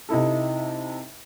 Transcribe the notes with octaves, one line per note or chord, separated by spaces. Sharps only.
C3 D#4 E4 A4